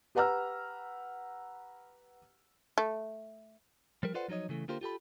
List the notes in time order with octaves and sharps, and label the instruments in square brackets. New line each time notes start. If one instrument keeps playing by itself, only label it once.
[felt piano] G4 B4 F#5 A#5 E6 F6
[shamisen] A3
[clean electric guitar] F3 G3 A#4
F4 A4 B4 C5 D5 F#5
F3 F#3 D#4 C#5 D#5
C#3 E3 A3
D3 A#3 F4 G4 A#4 C5
F4 G4 A4 B5